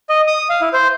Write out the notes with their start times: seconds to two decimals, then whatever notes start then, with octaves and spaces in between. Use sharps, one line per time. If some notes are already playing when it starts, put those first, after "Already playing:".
0.09 D#5
0.27 D#6
0.50 F5
0.61 E4
0.73 C5